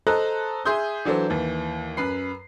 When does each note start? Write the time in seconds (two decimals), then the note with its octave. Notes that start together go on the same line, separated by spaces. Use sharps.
0.07 A4 C5 D#5 A#5 F#6
0.65 G#4 E5 C6 D#6 G6
1.05 E3 F#3 D4 A4 C5
1.30 D#2 E3
1.97 F#2 B4 B5 C7